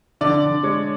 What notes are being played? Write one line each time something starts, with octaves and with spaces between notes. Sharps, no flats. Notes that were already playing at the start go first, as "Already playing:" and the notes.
D3 D5
D3
G#3 C#5